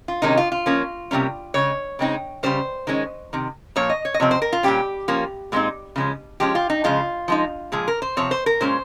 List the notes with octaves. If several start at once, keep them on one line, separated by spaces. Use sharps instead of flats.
F4
C3 D#3 G#3 C#4 D#4
F4
F4
F3 A#3 C#4
C3 G3 A#3 C#4
C#3 G#3 C#4 C#5
C#3 G#3 C4 D#4
C#3 G3 C#4 C5
D#3 G#3 C#4
C3 D#3
A#2 F3 A#3 C#5
D#5
C#5
D#5
C3 F3 C4 C#5
C5
A#4
F4
A#2 G3 C#4 G4
F3 A#3 C#4
A#2 G#3 C4 D#4
C#3 F3 G#3 C#4
F3 G#3 C#4 G4
F4
D#4
C#3 F3 G#3 F4
F3 G#3 D#4
A#2 F3 G#3 G#4
A#4
C5
C3 F3 C4 C#5
C5
A#4
A#2 G#3 C#4 C5